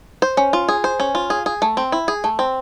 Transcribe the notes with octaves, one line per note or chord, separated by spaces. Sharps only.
C5
C#4
F4
G#4
C5
C#4
F4
G#4
G#4
A3
C4
E4
G#4
A3
C4